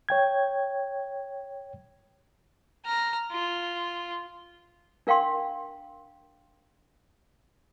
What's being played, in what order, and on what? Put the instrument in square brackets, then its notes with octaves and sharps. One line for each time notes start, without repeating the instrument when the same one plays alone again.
[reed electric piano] C#5 G5 G#6
[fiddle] A#5 F6
F4
[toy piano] D4 A#4 F5 G5 C6